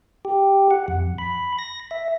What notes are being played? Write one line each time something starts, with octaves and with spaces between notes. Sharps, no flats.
G4
F#5
F2
B5
A#6
E5